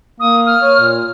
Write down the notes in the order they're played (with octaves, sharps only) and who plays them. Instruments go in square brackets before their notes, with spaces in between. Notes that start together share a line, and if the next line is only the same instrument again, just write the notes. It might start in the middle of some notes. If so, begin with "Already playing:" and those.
[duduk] A#3 [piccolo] D#6
[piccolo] F6
[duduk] C#5
A#2